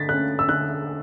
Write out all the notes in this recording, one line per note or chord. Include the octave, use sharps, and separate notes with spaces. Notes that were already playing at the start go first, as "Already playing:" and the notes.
Already playing: D3 A6 B6
A3 C#4 F#6
E6
D3 F#6